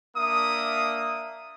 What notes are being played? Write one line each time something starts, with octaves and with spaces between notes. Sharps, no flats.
A#3 D4 E5 D#6